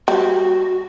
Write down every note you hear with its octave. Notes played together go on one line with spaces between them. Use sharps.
G3 F#4